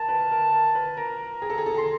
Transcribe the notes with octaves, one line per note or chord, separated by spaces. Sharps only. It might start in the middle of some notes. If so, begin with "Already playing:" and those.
Already playing: A#4 A5
B4
A#4
A#4
B4
A#4 A#5
G#4
A4
G#4
A4
G#4 C6